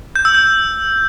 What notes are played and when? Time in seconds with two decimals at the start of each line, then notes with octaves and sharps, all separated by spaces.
0.16 G6
0.25 E6
0.35 G6